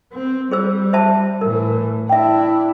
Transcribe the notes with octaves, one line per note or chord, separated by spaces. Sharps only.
C4
G3 G#4 C5 E6
C5 E5 A5
A2 E3 A#4
D4 E4 E5 G5